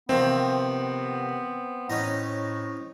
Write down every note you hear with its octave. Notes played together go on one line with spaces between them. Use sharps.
C3 D#3 F3 B3 C4
A2 C#4 D#4 D#5